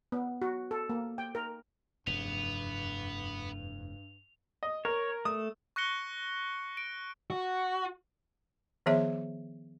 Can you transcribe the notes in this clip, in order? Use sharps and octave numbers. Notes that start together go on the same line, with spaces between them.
B3
F#4
A4
A#3
G5
A#4
F1 E2 G2 B3 F7
D#5
A#4 C#5
A3 D#6
C#6 F#6 A#6 C#7 G7
D7
F#4
D#3 F3 B3 G#4 C#5 E5